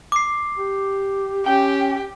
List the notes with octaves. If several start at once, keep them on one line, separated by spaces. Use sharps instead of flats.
D6 C7
G4
C#4 G4 G5